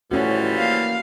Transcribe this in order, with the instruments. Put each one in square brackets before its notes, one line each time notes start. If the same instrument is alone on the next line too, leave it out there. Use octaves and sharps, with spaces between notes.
[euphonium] A2 [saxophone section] E3 F3 G3 [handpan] C#4 F#4
[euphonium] A#3 [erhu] F5